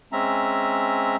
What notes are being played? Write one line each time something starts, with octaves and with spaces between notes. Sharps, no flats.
G#3 C4 C#4 E5 A#5